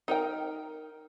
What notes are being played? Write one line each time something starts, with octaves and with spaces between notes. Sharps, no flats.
D#4 A#4 G5